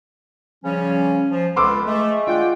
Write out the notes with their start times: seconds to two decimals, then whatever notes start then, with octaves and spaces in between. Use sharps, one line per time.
0.65 C#3 F3 G3 C#4
1.31 F3
1.56 C#2 A4 B4 C6 D6 E6
1.86 G#3 A3
2.27 F4 D5 F#5 G5